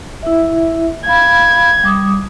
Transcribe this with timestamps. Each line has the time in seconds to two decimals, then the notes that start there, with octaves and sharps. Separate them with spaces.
0.23 E4 E5
1.06 F5 B5 G#6
1.83 G3 D6 D#6